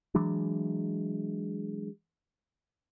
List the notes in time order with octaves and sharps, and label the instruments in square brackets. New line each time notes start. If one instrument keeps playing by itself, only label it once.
[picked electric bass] E3 F#3 G#3 D4